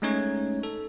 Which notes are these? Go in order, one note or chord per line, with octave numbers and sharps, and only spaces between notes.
G#3 A3 C#4 D#4 C#5 G#6
A4